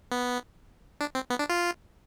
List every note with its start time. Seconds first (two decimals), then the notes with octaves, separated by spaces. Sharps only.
0.12 B3
1.01 D4
1.15 C4
1.30 B3
1.39 D4
1.50 F4